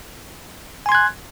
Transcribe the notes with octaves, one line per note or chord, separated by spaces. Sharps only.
G#5 C6 F#6 G#6